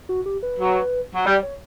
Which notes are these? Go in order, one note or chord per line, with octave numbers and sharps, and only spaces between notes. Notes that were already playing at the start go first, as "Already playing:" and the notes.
F#4
G4
B4
F#3
F#3
G3 D5
C#5